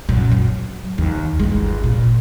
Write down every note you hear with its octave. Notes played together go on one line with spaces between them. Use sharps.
F#2 A#2
F#3
D#2
G1 G#3
A#2